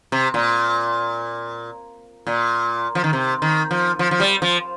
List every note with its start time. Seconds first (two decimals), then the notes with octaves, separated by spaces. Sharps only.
0.12 C3
0.34 A#2
2.27 A#2
2.95 F3
3.04 D#3
3.13 C3
3.42 D#3
3.71 F3
3.99 F3
4.11 F3
4.20 G3
4.42 F3